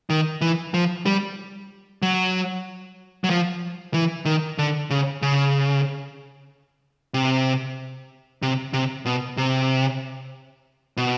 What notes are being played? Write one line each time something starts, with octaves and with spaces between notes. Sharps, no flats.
D#3
E3
F3
G3
F#3
F#3
F3
E3
D#3
D3
C#3
C#3
C3
C3
C3
B2
C3
B2